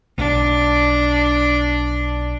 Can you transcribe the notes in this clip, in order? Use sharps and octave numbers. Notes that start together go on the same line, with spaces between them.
B1 D4